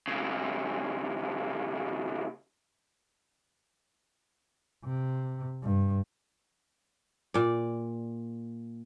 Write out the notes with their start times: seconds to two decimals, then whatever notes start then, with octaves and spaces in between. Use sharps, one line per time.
0.08 B1 C#3
4.84 C3
5.62 G2
7.34 A#2 D5